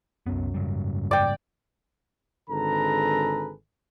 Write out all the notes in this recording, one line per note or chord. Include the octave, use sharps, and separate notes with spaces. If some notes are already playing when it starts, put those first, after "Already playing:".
C2 F#2 B3
G#2 C#3 G3
D5 G5
G#1 D3 G#4 A4 B4 A#5